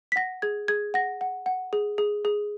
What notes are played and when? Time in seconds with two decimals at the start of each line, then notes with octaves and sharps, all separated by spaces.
0.12 B6
0.16 F#5 A#6
0.42 G#4 G#6
0.68 G#4 G#6
0.94 F#5 A#6
1.21 F#5
1.46 F#5
1.73 G#4
1.98 G#4
2.25 G#4